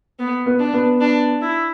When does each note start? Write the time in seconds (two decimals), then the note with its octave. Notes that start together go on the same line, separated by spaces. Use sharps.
0.19 B3
0.46 B3
0.59 D4
0.74 B3
1.01 D4
1.42 E4